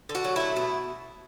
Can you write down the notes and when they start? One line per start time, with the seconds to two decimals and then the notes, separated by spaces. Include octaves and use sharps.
0.09 D3
0.15 F#4
0.24 F#3
0.36 A3 E4
0.56 B2 E4